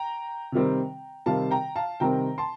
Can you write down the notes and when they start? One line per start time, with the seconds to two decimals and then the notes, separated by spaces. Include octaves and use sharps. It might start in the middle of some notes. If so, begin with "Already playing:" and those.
Already playing: G5 A#5
0.52 C3 D#3 G3 C4
1.26 C3 D#3 G3 C4 F5 A5
1.51 G5 A#5
1.76 F5 A5
2.00 C3 D#3 G3 C4 G5 A#5
2.38 A5 C6